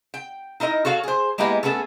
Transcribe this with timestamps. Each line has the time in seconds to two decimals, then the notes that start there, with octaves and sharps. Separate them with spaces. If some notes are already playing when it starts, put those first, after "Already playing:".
0.14 G5
0.60 D#4 E4 A#4 D#5
0.85 F#4 A4 C#5 F5
1.03 G#4 C5
1.38 G#3 A#3 B3 E4 G4 D#5
1.63 A3 B3 C#4 G#4 A4